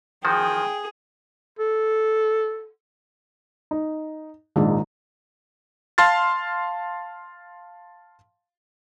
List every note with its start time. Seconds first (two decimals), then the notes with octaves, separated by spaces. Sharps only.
0.25 D#3 F3 F#4 G#4 G5
1.59 A4
3.71 D#4
4.56 A#1 G#2 D#3 G#3 D#4
5.98 F5 A5 C6 F6 A6